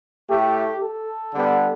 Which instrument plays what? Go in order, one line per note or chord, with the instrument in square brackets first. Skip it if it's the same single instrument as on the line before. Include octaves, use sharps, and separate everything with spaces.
[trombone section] A2 A3 G4
A4
D3 G3 B3